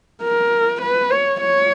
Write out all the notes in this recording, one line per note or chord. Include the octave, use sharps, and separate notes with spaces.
A#4
B4
C#5
C#5